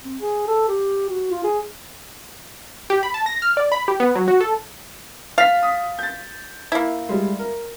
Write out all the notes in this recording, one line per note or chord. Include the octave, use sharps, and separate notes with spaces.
C4
G#4
A4
G4
F#4
F4
G#4
G4
B5
A5
A#6
F6
D5
B5
G4
B3
F#3
F#4
A4
F5 A6 B6
D#6
G6 A6
A#3 E4
G3 G#3
A#4